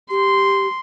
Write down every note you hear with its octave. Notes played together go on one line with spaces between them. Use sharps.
G4 C6